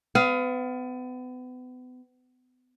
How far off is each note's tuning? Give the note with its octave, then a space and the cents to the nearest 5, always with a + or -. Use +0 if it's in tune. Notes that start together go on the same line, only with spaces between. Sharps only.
B3 +35 F5 +0